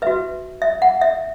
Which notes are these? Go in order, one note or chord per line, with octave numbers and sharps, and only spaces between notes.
F#4 B4 E5
E5
F#5
E5